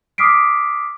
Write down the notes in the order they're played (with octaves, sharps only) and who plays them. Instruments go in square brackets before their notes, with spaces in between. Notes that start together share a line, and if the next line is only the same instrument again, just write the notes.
[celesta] D6 D#6 F6 B6 C7 D7